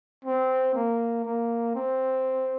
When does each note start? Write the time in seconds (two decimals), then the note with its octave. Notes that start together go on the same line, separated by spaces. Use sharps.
0.25 C4
0.75 A#3
1.25 A#3
1.75 C4